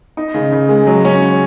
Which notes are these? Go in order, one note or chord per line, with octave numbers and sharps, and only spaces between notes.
D#4
C#3
C#3
G#3
F#3
C#4